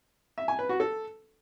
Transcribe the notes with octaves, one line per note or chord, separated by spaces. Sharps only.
E5
G#5
B4
F#4
A4